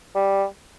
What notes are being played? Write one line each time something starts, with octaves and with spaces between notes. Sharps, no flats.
G3